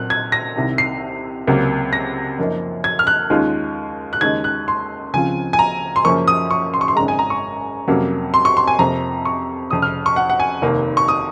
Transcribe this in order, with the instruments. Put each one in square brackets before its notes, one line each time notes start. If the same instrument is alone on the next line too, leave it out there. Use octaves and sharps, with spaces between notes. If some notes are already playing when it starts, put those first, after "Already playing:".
Already playing: [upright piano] A#2 F#3 C4 F#6
G#6
A#6
C2 C3 D#3
C7
C#2 C3 F#3 A#3
A#6
F#2 F3 A#3 D#4
G#6
F6
F#6
D#2 D#3 G#3 C#4 F4
F#6
D#2 C#3 G#3 D#4 G#6
F#6
C6
C#2 C#3 F3 C4 F4 G#5
G#5
A#5
C6
F#2 C#3 F3 A#3 C#6
D#6
C#6
C6
C#6
C6
G#1 F#2 C#3 G#3 A#5
G#5
A#5
C#6
F2 C3 F#3 A#3 C#4
C6
C#6
C6
G#5
F2 C3 F3 A#3 A#5
C#6
F1 F2 C#3 D#6
F6
C#6
F#5
F#5
G#5
F1 D#2 D#3 A#3
C#6
D#6